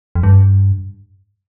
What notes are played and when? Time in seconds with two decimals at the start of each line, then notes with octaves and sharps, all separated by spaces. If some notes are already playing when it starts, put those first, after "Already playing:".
0.15 F2
0.23 G2